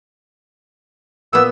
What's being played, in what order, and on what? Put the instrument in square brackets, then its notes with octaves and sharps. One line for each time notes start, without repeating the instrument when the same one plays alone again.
[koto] A#2 B3 [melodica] E6